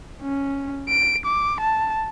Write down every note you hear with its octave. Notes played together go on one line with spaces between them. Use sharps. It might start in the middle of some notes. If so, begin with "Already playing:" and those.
C#4
D7
D6
A5